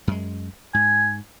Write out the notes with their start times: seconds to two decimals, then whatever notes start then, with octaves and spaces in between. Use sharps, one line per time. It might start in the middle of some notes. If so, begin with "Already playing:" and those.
0.07 F#2 G#3
0.74 G#2 G#5